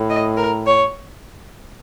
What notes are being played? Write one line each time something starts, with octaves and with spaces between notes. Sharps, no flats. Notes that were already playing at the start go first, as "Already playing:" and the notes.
Already playing: A2
D#5
A#4
C#5